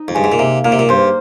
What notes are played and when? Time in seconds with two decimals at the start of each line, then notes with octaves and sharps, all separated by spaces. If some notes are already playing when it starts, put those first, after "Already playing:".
Already playing: D#4
0.08 F2
0.15 G2 G#3
0.24 G#2
0.32 A#2
0.39 C3 A#3
0.65 A#2 A#3
0.72 C3
0.79 A#2
0.89 G2 C5